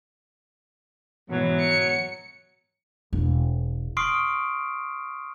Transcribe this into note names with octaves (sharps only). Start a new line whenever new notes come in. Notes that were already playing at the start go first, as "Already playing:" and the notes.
G#2 B2 E3 F#3
C#7
E1
C6 C#6 D#6 F6 C7 D7